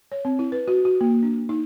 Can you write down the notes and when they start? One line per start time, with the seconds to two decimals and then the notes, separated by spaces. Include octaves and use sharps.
0.12 C#5
0.25 C4
0.39 E4
0.52 B4
0.68 F#4
0.85 F#4
1.01 A#3
1.23 D4
1.49 D#4